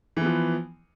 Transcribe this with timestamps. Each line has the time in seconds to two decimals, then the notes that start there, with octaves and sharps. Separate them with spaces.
0.17 E3
0.21 B3
0.26 F3